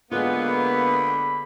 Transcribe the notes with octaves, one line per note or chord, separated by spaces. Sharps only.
D3 G#3 A#3 B3 F4
B5